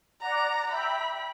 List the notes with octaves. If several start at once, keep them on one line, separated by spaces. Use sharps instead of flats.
D5 F#5 A#5
E5 G5 B5